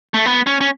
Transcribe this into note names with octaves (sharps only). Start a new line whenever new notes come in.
A3
B3
C#4
C#4